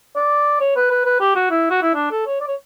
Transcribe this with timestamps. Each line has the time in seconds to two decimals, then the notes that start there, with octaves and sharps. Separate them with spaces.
0.16 D5
0.61 C#5
0.76 B4
0.91 B4
1.05 B4
1.20 G4
1.36 F#4
1.51 E4
1.70 F#4
1.83 E4
1.95 D4
2.11 A4
2.26 C#5
2.40 D5
2.47 C#5